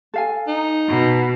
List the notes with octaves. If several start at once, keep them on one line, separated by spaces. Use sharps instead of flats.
A4 F5 G#5
D#4
B2